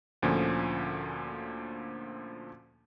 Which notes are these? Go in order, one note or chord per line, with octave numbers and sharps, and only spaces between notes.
D2 A#2 D3 F3 C#4